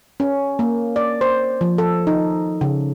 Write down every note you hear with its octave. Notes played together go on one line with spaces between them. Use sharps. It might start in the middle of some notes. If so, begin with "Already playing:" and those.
C#4
A#3
D5
C5
F3
A4
D#4
C#3